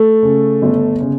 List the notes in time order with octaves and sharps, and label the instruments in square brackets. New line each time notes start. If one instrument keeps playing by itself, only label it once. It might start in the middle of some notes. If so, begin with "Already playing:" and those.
Already playing: [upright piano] A3 A4
C#3
G1
C#3